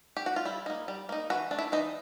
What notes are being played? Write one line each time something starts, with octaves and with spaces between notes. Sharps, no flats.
G4
F#4
F4
G3 E4
A#3 D#4
G3
A#3 D#4
E3 F#4
A3 D4
E4
E3 D#4